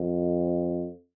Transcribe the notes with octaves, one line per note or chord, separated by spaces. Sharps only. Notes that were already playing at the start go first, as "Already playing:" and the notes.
Already playing: F2